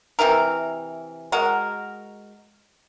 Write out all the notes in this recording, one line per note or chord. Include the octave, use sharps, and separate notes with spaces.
C3 E3 E4 A#4
G#3 F#4 A#4